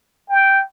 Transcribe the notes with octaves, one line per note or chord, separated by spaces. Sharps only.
G5